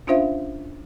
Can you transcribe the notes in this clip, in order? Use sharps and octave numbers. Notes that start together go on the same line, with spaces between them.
C#4 D4 F4 C5 E5 F5